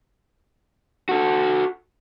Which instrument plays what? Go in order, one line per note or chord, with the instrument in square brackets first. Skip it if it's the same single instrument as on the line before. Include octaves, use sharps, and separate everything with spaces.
[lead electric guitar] F#4 A4